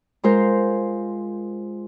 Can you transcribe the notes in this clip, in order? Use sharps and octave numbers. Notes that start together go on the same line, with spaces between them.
G#3 F4 A#4 C5